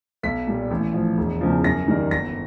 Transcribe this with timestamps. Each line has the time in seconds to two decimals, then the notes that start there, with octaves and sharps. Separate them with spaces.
0.23 B1 B6
0.47 A#2 G3
0.71 A1
0.94 A2 F3
1.18 E1
1.41 E2 C#3 F3
1.64 F#2 A#6
1.88 D#3 G3 A#3
2.11 G1 A#6